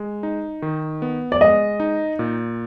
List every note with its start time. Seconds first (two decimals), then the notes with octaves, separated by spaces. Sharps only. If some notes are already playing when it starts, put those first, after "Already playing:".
Already playing: G#3
0.23 D#4
0.62 D#3
1.02 B3
1.32 D5
1.41 G#3 D#5
1.80 D#4
2.19 A#2